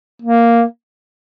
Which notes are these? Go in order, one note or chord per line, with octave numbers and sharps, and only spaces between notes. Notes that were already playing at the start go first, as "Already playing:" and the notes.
A#3